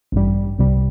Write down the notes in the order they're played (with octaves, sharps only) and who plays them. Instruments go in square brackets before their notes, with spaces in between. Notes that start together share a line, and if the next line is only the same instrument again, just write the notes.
[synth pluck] A1 G2 G3
C2 C3 G3